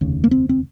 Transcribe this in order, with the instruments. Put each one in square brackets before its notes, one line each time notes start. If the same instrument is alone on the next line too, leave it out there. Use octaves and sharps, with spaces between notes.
[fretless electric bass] F1 D#2 C#3
A#3
C4
C4